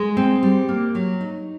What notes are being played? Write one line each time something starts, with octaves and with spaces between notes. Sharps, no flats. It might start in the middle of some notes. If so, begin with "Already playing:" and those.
Already playing: G#3
C4
G3
A#3
F#3
D#4